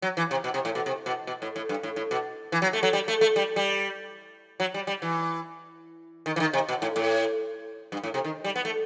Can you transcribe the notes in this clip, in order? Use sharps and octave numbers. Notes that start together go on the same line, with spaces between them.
F#3
E3
C3
B2
C3
A2
B2
C3
B2
B2
A2
A2
G2
A2
A2
B2
E3
F#3
A3
F#3
G3
A3
A3
G3
G3
F#3
G3
G3
E3
D#3
E3
D#3
C3
B2
A2
A2
G2
A2
C3
D#3
G3
B3
A3